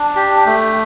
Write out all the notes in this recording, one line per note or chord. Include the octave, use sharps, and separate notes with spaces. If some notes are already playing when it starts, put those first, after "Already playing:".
Already playing: D4
G4
A3